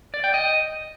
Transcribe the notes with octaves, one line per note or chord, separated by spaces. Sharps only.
D5
G5
D#5